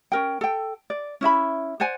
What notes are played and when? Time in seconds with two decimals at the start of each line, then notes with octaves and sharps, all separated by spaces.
0.12 C#4 A#4 G5
0.41 A4 G5
0.90 D5
1.21 C#4 E4 E5 B5
1.80 C5 D5 F#5 G#5